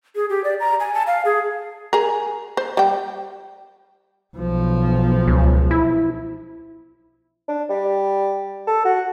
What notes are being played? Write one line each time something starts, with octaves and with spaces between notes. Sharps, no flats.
G#4
G4
D5
A#5
G#5
A5
F5
G#4
G#4 A#4
C5
G3 G5
B1 F3
C#2
E4
D4
G3
A4
F#4